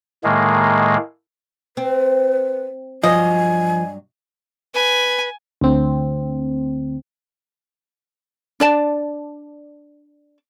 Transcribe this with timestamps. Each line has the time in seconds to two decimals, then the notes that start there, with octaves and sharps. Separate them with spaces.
0.24 A2 D#3 G#3 A#3
1.77 C4 B4
3.03 G2 F3 F#3 D#5 G#5
4.74 B4 G#5
5.61 D2 C4
8.60 D4 D5 A5